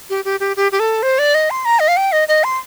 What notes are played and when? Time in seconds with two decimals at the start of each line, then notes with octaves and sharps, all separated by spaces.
0.10 G4
0.25 G4
0.40 G4
0.57 G4
0.72 G4
0.80 A4
1.03 C5
1.19 D5
1.35 D#5
1.50 C6
1.65 A#5
1.80 D#5
1.88 F5
1.97 G5
2.12 D#5
2.28 D#5
2.44 C6